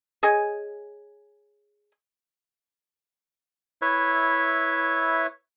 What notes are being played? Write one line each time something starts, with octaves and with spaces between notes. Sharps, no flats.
G#4 C#5 D#5 G#5
E4 B4 C#5 E5